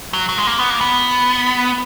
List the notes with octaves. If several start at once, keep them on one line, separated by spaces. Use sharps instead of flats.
F#3
F#3
G#3
A#3
B3
A#3
B3